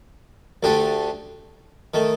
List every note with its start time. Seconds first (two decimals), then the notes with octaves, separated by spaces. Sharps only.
0.63 D2 D3 A3 D4 G4
1.94 D#3 A3